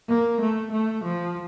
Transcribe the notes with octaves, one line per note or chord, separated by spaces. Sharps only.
A#3
A3
A3
F3